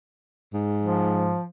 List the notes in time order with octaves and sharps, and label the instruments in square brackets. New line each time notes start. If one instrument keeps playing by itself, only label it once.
[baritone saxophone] G#2
[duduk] F3